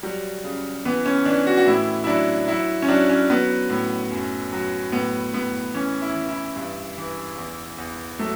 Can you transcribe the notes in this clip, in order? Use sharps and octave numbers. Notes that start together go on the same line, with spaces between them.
F#3 G3
C#3
E3 B3
C#4
E3 D4
F#4
F#4
A2 E4
E4
F#3 D4
F#3 E4
C#4
F#3 D4
C#4
F#3 B3
A2
F#2
F#3
A2 B3
A2 B3
E3 C#4
E4
E3
E4
G2
E3
E2
E2
F#3 A3